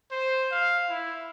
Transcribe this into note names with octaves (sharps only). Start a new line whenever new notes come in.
C5
F5
E4